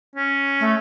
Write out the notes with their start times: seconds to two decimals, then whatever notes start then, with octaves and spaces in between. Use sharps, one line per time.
0.15 C#4
0.60 A3